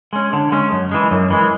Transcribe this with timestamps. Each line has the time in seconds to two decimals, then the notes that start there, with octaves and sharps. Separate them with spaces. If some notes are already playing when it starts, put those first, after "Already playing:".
0.13 G#3 C#4
0.33 D3
0.52 G#3 C#4
0.72 F#2
0.92 E3 G#3
1.11 F#2
1.30 E3 G#3